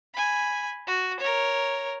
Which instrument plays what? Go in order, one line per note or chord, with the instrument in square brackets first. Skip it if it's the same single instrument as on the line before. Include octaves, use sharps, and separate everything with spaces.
[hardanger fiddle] G#5 B5
F#4
A#4 C#5